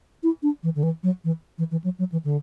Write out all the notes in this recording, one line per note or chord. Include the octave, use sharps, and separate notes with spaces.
E4
D4
E3
D3
E3
F#3
E3
E3
E3
F#3
F#3
E3
D3